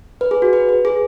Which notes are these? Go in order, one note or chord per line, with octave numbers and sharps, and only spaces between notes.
B4
G#4
F#4
B4
B4
G#4